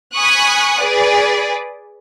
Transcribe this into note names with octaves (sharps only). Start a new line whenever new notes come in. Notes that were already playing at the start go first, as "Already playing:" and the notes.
G#5 B5 C#6 D#6 F#6
G#4 B4 D5